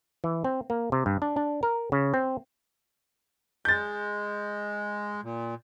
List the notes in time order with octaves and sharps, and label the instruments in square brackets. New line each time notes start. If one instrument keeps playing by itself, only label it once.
[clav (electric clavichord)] E3
C4
A#3
C3
G2
D4
D4
A#4
C#3
C4
[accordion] G#3 [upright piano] G6 A6
[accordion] A#2